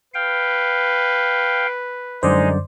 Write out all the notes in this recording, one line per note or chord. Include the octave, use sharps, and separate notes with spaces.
B4 F5 G5
F#2 D3 G3 G#3 D#4 C5 D5